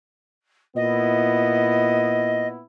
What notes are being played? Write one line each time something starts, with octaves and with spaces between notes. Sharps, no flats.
A#2 B3 E4 D#5